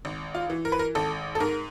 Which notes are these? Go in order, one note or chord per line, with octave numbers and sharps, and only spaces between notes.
G#1
F4
E3
A#4
B4
A#4
G#1 A4
A4
G#2 A#4